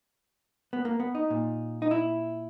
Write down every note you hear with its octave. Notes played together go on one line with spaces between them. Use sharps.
B3
A#3
B3
D#4
A#2
D#4
E4